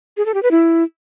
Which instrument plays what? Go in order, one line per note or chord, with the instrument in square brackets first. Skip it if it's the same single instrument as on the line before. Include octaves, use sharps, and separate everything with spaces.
[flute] G#4
A4
G4
B4
E4